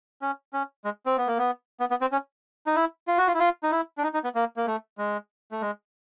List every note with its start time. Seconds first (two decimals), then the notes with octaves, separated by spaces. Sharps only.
0.22 C#4
0.53 C#4
0.85 G#3
1.06 C4
1.17 B3
1.27 A#3
1.38 B3
1.80 B3
1.91 B3
2.01 C4
2.12 C#4
2.67 D#4
2.75 E4
3.08 F4
3.18 F#4
3.28 F4
3.34 E4
3.40 F4
3.63 D#4
3.72 E4
3.98 D4
4.03 D#4
4.14 D#4
4.24 B3
4.35 A#3
4.57 A#3
4.67 A3
4.98 G#3
5.52 A3
5.61 G#3